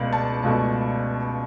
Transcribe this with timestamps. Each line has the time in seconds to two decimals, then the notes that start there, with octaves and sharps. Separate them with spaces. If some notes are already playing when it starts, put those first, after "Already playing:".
Already playing: C#2 B2 A3 D5
0.13 A5
0.43 C#2 B2 A3